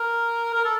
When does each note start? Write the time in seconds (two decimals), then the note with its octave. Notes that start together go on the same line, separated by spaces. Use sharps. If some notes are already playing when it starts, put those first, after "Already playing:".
Already playing: A#4
0.54 A#4
0.65 A4